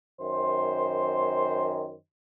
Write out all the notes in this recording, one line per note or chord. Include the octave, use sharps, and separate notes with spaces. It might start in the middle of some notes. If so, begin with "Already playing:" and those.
F#2 D#3 C5